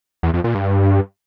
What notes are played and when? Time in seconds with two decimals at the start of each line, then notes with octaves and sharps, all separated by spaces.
0.23 E2
0.34 F2
0.44 A#2
0.55 G2